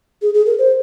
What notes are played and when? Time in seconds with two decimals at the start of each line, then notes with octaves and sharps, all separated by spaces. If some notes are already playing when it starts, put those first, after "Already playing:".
0.22 G#4
0.34 G#4
0.46 A#4
0.59 C5